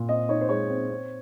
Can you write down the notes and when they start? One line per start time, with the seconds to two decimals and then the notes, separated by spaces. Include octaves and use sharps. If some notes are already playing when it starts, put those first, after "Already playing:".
Already playing: A#2
0.09 C4 D#5
0.29 D#4 C#5
0.41 C5
0.49 G#3 C#5
0.70 C4
0.90 C4